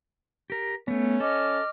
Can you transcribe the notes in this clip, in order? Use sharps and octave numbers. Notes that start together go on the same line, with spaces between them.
G4 A#4
A3 B3 C#4
A4 D#5 D6 F6